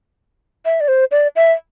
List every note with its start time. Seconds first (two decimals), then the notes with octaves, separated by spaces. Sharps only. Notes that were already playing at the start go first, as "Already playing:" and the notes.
0.65 E5
0.81 D5
0.88 C5
1.11 D5
1.36 E5